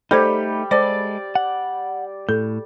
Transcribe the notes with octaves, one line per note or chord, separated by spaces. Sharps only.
G3 A3 D#4 G4 A4 C5 G#6
G#3 A4 C5 D5
F#5
A2 A4